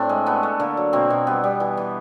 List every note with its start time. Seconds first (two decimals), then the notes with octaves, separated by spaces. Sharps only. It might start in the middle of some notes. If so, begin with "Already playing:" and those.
Already playing: A2 C4 D4
0.09 G#3
0.26 A3 B3
0.43 A3
0.60 D3 A#3
0.77 F#3
0.93 B2 A#3 C4
1.10 B2
1.27 G3 B3
1.44 G3
1.60 E3
1.77 E3